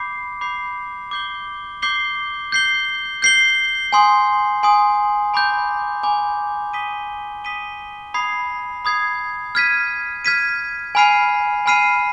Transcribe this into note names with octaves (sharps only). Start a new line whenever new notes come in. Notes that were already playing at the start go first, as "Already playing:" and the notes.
Already playing: B5 D6 G6 C7
B5 D6 G6 C7
D6 G6 C7 G7
D6 G6 C7 G7
G6 C7 G7
G6 C7 G7
G#5 C6 D#6
G#5 C6 D#6
G#5 B5 D6 G6
G#5 B5 D6 G6
D#6 B6 D#7 G7
D#6 B6 D#7 G7
B5 D#6 G#6 C7
B5 D#6 G#6 C7
F6 G#6 B6 D#7
F6 G#6 B6 D#7
G#5 B5 F6 C7 D#7
G#5 B5 F6 C7 D#7